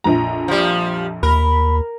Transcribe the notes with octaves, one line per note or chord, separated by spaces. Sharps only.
A#1 F2 A#5
F3 G3
D#2 A#4 B5